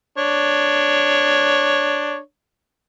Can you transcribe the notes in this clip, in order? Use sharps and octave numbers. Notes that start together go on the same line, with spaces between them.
D4 C#5